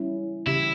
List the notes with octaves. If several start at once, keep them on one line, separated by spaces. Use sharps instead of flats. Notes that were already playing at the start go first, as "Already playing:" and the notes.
Already playing: G3 C#4 E4
C#3 E3 G3 C#4 E4 G4